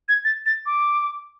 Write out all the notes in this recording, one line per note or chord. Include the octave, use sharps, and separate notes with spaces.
G#6
A6
A6
D6